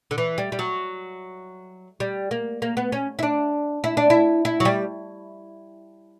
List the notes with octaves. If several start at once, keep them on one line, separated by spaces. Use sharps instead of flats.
D3
E3
G3
G3
F#3
G3
A#3
A#3
B3
C#4
E4
D4
E4
D4
E4
E4
F#3
G3